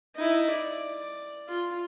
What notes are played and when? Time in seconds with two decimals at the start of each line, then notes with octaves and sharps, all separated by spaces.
0.15 D#4 E4
0.50 D5
1.48 F4